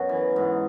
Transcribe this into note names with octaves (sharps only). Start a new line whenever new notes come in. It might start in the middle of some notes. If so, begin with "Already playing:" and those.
Already playing: F#2 B2 F#3
E3
G#2